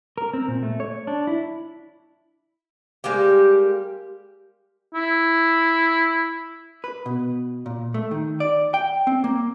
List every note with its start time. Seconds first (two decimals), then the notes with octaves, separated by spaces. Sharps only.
0.18 A#4
0.33 C4
0.48 A#2
0.63 A3
0.80 C#5
1.07 D4
1.27 E4
3.04 G3 G#3 A#3 G4
4.94 E4
6.84 B4
7.06 B2
7.66 A#2
7.94 A3
8.11 D#3
8.40 D5
8.74 G5
9.07 C4
9.24 A#3